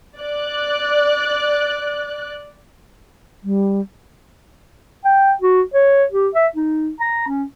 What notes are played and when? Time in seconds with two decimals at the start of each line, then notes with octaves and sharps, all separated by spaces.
0.18 D5 F#6
3.44 G3
5.05 G5
5.42 F#4
5.74 C#5
6.12 G4
6.35 E5
6.56 D#4
7.00 A#5
7.28 C#4